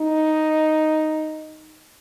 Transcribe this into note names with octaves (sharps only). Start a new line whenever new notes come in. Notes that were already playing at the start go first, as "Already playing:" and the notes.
Already playing: D#4